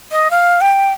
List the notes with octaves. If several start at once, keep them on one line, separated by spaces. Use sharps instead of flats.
D#5
F5
G5